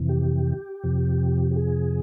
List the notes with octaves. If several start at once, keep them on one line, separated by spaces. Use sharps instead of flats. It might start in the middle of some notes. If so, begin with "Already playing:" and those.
Already playing: F2 C3 E3
G4
F2 C3 F3
G4
G#4